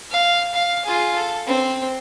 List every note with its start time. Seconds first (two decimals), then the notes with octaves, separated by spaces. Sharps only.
0.11 F5
0.54 F5
0.85 F4 G#4
1.16 A4
1.47 C4